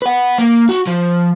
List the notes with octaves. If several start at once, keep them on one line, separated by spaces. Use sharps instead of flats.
B4 F#5
A#3
F#4
F3